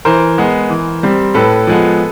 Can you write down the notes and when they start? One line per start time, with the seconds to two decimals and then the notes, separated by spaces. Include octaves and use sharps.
0.05 E3 A#4 C5
0.38 G#3 B3
0.70 E3
1.03 G3 C4
1.34 A2 A4 B4
1.67 F3 G#3 B3